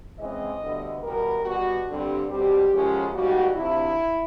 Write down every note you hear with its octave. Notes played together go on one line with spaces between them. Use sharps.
C#3 E3 G#3 C4 D#5
D2 D3 G3 B3
E2 B2 G3 B3 A#4
B2 G3 B3 F#4
G2 D3 G3 C4
B2 G3 C4 G4
F#2 C#3 F3 G#3 C#4
G#2 D#3 G3 A#3 F#4
D2 C3 F3 E4